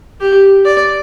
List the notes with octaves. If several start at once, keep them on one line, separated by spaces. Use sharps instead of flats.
G4
D5